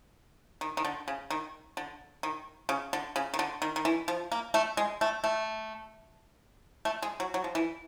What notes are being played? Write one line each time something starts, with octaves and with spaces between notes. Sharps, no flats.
D#3
D#3
D3
C#3
D#3
D3
D#3
C#3
D3
C#3
D#3
D3
D#3
D#3
E3
F3
A#3
A3
G#3
A3
A3
A3
G#3
F#3
F#3
F3
E3